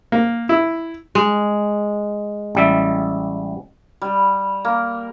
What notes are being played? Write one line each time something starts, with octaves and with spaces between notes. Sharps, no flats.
A#3
E4
G#3
A1 G3 E5
G3
A#3